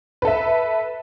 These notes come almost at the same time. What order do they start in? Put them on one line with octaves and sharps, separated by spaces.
B4 A4 E5